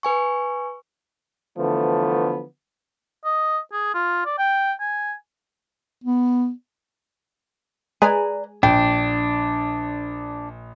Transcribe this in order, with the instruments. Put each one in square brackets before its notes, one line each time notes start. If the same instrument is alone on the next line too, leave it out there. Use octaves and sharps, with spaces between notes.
[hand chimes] B4 G#5 C#6
[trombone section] D3 E3 F3 A3 B3
[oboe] D#5
G#4
F4
D5
G5
G#5
[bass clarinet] B3
[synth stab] G#3 G#4 G#5 [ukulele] B4 D5 A#5
[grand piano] A#1 [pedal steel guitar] D4 [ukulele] G5